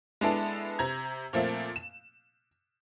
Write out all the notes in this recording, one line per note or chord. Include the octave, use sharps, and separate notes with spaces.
G#3 B3 D4 E4 A4
C3 A#5 G#6
A#2 F3 A3 A#3 C4
E7